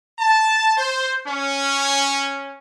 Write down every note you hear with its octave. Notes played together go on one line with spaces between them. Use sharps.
A5
C5
C#4